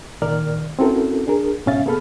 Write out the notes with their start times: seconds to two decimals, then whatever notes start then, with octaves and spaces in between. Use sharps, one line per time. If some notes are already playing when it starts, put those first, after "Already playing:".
0.22 A#2 D#3 A#4 D5 F6
0.79 C4 C#4 E4 F#4 A4 A#4
1.27 D4 G#4 A#4
1.66 G2 B2 C#4 E5 F5 A6
1.86 A#3 B3 G#4 A4 B5 F6